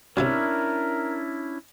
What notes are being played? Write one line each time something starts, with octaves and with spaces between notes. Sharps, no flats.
F#2 A2 C3 C#4 D4 E4 A#4